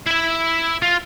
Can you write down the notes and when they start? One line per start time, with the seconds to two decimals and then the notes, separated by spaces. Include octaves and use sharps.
0.06 E4 E5
0.82 F4